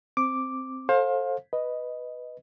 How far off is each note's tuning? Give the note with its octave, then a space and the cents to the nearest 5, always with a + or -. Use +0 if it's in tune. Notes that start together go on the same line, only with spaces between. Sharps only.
C4 +0 D6 +0
A4 +0 C5 +30 F5 +20
B4 +0 D#5 +0